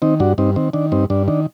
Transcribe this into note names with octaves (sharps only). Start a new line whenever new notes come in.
D#3 C4 D#4
G2 D4 F#4
G2 C4 D#4
D#3 C4
D#3 D4
G2 C4 D#4
G2 D4
D#3 D4